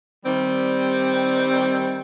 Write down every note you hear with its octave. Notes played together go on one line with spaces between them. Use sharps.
D#3 G3 C4